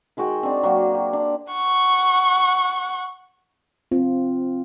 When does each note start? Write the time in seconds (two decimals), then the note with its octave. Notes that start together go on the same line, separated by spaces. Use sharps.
0.17 D#3 G#3 F#4 G5
0.43 C4 D4
0.63 F#3 A#3
0.95 G4
1.13 D4
1.53 F#5 C#6
3.91 C4 F4